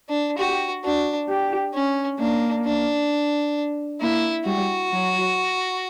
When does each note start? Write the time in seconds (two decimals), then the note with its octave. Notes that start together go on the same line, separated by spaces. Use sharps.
0.09 D4
0.38 F#4 G4
0.84 D4 F#4
1.29 G4
1.74 C#4
2.19 A#3 D4
2.65 D4
4.01 A#3 E4
4.46 G3 F#4
4.92 F#3